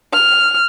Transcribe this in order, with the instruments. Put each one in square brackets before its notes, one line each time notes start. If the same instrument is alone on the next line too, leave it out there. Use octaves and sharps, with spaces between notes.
[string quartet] F6